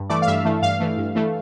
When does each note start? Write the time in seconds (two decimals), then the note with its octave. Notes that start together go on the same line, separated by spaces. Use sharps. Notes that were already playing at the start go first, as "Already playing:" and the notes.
Already playing: G2
0.10 E3 A3 D5
0.22 F5
0.27 G2 E5
0.45 E3 A3
0.62 G2 F5
0.80 E3 A3
0.98 G2
1.15 E3 A3